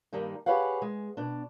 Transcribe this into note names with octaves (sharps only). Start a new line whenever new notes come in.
G2 D#3 G3 A#3 D#4
G4 G#4 B4 C#5 F5 F#5
G#3
B2 D4